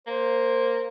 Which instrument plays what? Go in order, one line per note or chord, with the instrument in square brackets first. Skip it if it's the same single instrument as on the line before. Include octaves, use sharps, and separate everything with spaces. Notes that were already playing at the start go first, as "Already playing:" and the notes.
[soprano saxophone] A#3 [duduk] C5